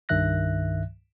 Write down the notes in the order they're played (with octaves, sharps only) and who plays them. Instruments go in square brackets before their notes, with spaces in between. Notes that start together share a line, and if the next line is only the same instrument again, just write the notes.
[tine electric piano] C2 G2 D#3 E5 F#6 A#6